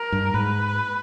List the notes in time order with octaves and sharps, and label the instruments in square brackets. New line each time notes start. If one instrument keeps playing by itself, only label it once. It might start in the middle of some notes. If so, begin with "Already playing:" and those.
Already playing: [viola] A#4
[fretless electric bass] G2
[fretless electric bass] G#2 [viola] B4